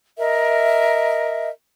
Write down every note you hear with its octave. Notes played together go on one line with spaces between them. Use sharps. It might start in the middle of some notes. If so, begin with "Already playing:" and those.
A#4 D#5 E5